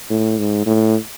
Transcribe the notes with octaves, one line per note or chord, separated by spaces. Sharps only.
A2
G#2
A2